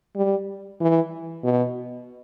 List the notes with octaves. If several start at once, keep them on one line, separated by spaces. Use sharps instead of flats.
G3
E3
B2